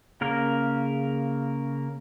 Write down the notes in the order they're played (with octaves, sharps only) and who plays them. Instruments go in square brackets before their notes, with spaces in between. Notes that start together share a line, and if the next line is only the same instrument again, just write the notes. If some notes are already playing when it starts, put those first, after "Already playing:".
[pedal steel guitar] C#3 A#3 A#4